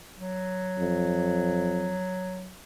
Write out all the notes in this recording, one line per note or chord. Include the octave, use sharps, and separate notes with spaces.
F#3
F2